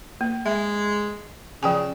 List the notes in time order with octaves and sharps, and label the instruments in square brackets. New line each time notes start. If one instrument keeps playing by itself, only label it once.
[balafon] A#3
[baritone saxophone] G#3 [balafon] E5
[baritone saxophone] C#3 [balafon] F3 G5 G#5